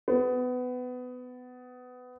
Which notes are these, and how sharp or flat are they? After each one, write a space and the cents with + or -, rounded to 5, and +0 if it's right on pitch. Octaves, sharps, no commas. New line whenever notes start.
B3 +20